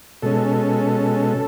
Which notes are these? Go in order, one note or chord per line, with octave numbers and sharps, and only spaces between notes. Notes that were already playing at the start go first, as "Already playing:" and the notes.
B2 G#3 C#4 A4